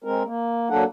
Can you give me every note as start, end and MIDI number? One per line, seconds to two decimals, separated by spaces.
0.04 0.23 56
0.04 0.23 60
0.04 0.23 70
0.25 0.70 58
0.70 0.84 54
0.70 0.84 58
0.70 0.84 62
0.70 0.84 69
0.70 0.84 78